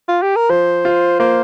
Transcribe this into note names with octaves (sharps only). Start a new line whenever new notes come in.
F4
G4
A#4
F3 C5
F4
A#3 C5